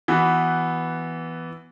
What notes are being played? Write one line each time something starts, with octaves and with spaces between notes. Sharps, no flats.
E3 B3 F#4